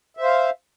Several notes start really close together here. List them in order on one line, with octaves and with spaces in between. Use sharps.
E5 C5 F5